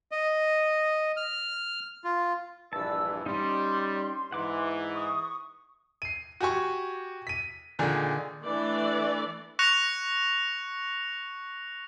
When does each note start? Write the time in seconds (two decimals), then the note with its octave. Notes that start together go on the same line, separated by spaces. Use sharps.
0.11 D#5
1.17 F6
2.04 F4
2.73 A#1 G2 E3 B4 D5 A5 E6
3.26 G3 C#4 D#4 C6
4.32 G#2 E3 F#5 D6
4.94 C#6 D#6
6.02 C7 D#7
6.41 F#4 G4 G#5 C#6
7.27 B6 D#7
7.79 A#2 D3 D#3 G#4
8.43 E3 A3 D4 D5
9.59 C#6 F#6 A#6 C#7 F7